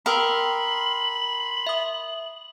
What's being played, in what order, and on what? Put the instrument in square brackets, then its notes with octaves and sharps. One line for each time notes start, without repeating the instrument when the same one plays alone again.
[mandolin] A#4 [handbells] G5 D#6 E6 [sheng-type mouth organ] B5 C6 [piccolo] F#7
[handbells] E5 D#6